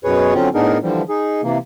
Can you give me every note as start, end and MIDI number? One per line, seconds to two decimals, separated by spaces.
0.04 0.34 42
0.04 0.34 47
0.04 0.34 68
0.04 0.34 71
0.04 0.34 73
0.34 0.49 50
0.34 0.49 54
0.34 0.49 60
0.34 0.49 61
0.34 0.49 65
0.54 0.78 45
0.54 0.78 59
0.54 0.78 62
0.54 0.78 63
0.54 0.78 68
0.54 0.78 70
0.82 1.02 50
0.82 1.02 52
0.82 1.02 53
0.82 1.02 55
1.09 1.41 63
1.09 1.41 68
1.43 1.58 48
1.43 1.58 52
1.43 1.58 58